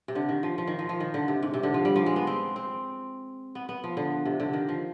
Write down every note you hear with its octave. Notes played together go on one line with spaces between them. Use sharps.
C3
D3
D#3
F3
F3
D#3
F3
F3
D#3
D3
C3
G#2
C3
D3
F3
G3
F3
G#3
B3
C4
C4
B3
B3
F3
D3
C3
D3
D#3
F3